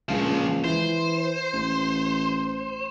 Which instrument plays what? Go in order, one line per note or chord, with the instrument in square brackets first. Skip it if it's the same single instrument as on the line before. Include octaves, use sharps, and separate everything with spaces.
[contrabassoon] C#2 [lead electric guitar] A#2 F3
[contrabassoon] E3 [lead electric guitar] C5
[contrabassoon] A1